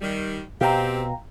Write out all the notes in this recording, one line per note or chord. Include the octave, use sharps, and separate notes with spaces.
D#3 G3
B2 C4 G4 F5 G5 A#5